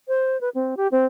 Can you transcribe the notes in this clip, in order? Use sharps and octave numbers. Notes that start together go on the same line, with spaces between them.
C5
B4
C4
G4
C4